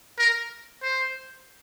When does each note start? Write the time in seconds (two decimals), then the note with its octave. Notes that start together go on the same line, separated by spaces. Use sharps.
0.18 A#4
0.83 C5